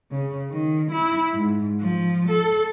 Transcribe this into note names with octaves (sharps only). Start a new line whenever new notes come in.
C#3
D#3
E4
G#2
F3
A4